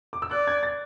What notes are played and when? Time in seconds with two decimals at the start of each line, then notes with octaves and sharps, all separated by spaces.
0.13 D6
0.22 E6
0.31 D5 F#6
0.47 G#6
0.63 A6